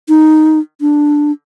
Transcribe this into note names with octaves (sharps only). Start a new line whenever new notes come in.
D#4
D4